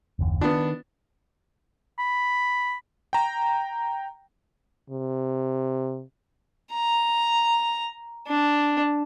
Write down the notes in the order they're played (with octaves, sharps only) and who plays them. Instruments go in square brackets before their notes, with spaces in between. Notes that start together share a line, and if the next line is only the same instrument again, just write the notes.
[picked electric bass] F#1 D#2
[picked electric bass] D#3 [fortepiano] B3 D4
[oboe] B5
[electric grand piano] G5 A#5
[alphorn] C3
[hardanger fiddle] A#5
D4